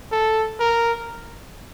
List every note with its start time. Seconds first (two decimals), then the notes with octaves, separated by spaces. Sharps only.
0.12 A4
0.60 A#4